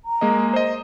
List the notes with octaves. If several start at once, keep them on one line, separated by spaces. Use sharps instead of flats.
A#5
G#3 A#3 D#5
C5 D#5